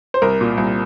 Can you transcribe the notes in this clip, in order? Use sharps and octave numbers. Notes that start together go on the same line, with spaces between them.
C5
C2 A#4
A#2
C2